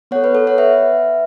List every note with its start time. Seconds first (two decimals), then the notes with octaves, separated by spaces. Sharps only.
0.11 B3 A4 C#5 F#5
0.24 B4
0.35 A4
0.47 C#5 F#5
0.58 B4 E5